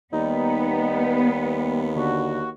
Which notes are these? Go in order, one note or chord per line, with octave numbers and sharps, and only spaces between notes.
D#2 G3 B3 D#4
D3 F#4